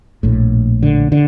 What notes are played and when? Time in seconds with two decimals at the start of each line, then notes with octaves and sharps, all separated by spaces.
0.23 A#1 A2
0.83 D3
1.12 D3